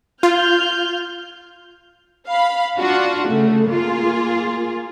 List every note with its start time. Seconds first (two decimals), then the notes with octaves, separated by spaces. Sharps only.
0.23 F4 F6 G6 G#6
2.27 F5 B5
2.78 D4 F4 F#4
3.27 C#3 A3
3.69 A#3 F4 G#4